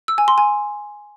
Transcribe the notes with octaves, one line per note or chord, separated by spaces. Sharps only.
E6
G#5
C6
G#5